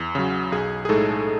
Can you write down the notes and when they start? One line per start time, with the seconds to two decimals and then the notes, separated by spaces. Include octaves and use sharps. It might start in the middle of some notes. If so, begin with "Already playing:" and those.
Already playing: E2
0.15 C#3 F#3
0.52 B1 G#4
0.85 G#4
0.89 A2 G#3 D#4 A4